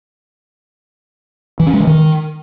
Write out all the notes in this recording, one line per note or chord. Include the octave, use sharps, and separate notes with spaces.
E3
C#4
G#3
E3
D#3